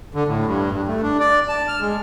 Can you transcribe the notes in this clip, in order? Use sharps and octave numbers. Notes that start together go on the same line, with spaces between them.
D3
A2
G2
G2
A3
D4
D5
A5
F6
G#3